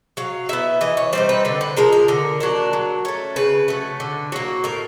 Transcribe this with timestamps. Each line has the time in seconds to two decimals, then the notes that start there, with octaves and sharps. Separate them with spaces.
0.17 F#3 F5
0.49 B3 E4 E5
0.81 E3 D#5
0.97 C#5
1.13 G3 C4 D#4 C5
1.29 B4
1.45 D3 B4
1.61 B4
1.77 F3 G#3 A#4
1.93 A#4
2.08 D3 A#4
2.40 F#3 A#3 D4
2.73 F#3
3.05 A3 C#4
3.36 C#3 B4
3.68 F#3 A3
4.00 D3
4.32 F#3 A#3
4.64 A2 A#4